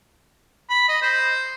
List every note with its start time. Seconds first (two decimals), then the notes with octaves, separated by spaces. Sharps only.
0.70 B5
0.89 D#5
1.02 C5